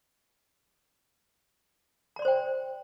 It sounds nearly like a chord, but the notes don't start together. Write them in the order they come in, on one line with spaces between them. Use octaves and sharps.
A#5 D5 C6 C5 G5